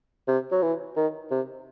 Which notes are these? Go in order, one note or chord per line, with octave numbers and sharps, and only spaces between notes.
C3
F#3
E3
D#3
C3